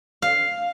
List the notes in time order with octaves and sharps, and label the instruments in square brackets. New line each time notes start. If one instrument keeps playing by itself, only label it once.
[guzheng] F5